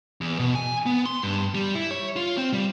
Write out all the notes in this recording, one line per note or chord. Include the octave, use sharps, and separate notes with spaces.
E2
B2
G#5
B3
C6
G2
G3
E4
C#5
F4
C4
G3